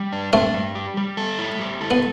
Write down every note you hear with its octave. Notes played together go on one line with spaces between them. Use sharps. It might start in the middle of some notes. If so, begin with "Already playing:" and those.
Already playing: G3
D4
A3 C4 D4
G3
G4
G3
A4
E4
G3
A4
B3